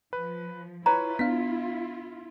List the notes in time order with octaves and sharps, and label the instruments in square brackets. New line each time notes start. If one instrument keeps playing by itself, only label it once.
[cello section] F3 [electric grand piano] B4
[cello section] E4 F4 [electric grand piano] B4 C#5 [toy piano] A#5
[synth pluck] B3 D4 F5 [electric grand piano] B6